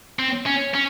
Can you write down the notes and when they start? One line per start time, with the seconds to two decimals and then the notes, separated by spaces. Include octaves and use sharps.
0.19 C4
0.46 C#4
0.74 C#4